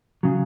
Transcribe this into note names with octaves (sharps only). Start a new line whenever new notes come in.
C#3 F#3